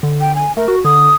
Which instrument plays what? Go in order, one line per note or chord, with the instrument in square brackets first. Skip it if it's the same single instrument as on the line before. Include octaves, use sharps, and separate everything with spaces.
[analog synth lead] D3
[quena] G5
G#5
[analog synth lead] A3 [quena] A#4
[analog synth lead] F#4
[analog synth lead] D3 [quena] D#6